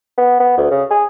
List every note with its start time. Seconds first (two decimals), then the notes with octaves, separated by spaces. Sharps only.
0.17 B3
0.40 B3
0.57 D2
0.70 C#3
0.90 G#4